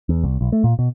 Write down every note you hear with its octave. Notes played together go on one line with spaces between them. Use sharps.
E2
C2
B1
A3
A#2
B2